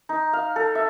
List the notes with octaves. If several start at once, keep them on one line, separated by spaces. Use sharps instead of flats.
D#4
F5
A4
E5